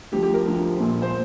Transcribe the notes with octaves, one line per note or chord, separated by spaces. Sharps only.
D2 D3 F3 G4
G4
A#4
D2 D3 F3
A#1 A#2 F3
C5